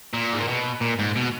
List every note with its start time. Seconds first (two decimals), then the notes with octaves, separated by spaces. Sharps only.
0.13 A#2
0.33 G#2
0.40 A#2
0.48 B2
0.81 A#2
0.99 G#2
1.16 B2